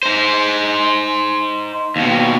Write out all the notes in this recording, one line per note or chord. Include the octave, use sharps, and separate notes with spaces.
D#4 C5
D#2 B2